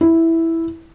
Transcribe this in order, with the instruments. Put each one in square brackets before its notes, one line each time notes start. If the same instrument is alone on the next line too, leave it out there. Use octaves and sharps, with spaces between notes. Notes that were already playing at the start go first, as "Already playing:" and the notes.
[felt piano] E4